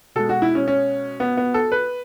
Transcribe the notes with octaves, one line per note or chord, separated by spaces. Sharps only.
B2 G#3 A4
F#4
E4
C#4
C#4
B3
B3
A4
B4